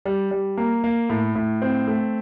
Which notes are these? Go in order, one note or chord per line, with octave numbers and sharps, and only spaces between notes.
G3
G3
A#3
A#3
A2
A2
C4
A3